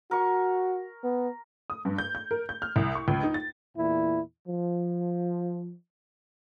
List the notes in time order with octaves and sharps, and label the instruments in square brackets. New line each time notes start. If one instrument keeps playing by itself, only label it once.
[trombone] F#4 [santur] A#4 C#6
[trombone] B3
[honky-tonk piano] D#6
G2
G6
G6
A#4
G6
F6
C2
C#6
C#2
D#4
A6
[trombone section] E2 A#2 E4
F3